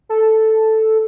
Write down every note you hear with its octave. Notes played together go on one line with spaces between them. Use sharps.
A4